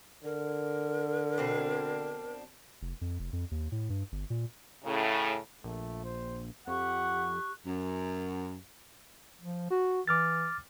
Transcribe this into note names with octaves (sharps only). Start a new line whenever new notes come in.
D3 A#4
B2 C4 D4
F1
F2
F1
F2
D#2
A2
G2
G1
A#2
A2 C#3
A#1 A3
C5
F2 G4 F#5 C#6 F#6
F#2
F3
F#4
E3 D6 F6 A6